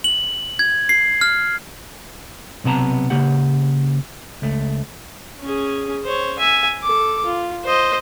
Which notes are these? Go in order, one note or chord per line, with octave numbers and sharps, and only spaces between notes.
F#7
G#6
C7
F6
B1 C3 B3 A5 A#5
C#3 A#3 G4 F#5
C#2 A3
C#4 G#4
C5 C#5
E5 G#5
A4 D6
F4
C5 D#5